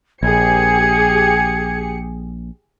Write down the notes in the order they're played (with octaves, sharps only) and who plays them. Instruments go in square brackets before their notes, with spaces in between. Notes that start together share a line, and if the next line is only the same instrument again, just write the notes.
[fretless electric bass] A#1 [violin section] G4 G#4 C#7 [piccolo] G#6